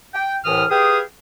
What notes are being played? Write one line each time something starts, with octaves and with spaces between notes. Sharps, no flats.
G5
C2 A2 E3 D#6 F6
G4 G#4 B4 F5 G5 D#6